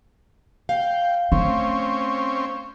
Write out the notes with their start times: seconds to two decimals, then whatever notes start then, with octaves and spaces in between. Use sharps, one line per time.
0.69 F5 G5
1.32 A3 C4 C#4